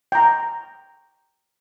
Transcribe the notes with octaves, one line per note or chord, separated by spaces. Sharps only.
G5 A#5